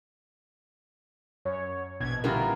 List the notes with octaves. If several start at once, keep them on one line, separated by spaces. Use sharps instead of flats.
F#2 C#5
A#1 B2 G#6
A1 D3 G3 B3 E4 F4 A#4